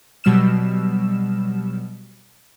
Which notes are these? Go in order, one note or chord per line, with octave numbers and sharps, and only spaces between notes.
B2 F#3 G3 E6 F6 E7